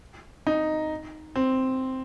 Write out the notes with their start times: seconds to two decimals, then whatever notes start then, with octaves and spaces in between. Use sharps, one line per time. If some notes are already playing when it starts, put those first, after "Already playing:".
0.47 D#4
1.36 C4